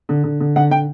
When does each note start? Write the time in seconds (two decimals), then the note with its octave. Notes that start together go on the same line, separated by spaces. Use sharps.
0.09 D3
0.24 D3
0.40 D3
0.56 D3 F#5
0.71 D3 G5